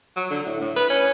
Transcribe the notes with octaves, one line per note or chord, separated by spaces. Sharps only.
F#3
D3
A2
A2
B4
C#4